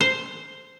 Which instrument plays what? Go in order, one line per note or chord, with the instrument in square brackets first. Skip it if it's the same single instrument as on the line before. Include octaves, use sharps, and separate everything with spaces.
[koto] C5